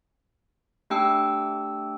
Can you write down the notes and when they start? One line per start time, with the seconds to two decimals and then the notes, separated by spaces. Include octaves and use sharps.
0.90 A3 D4 G4 G5 E6